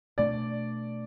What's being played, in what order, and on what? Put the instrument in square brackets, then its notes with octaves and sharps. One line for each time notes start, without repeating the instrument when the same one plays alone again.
[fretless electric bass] B2 A3 D4 [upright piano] D5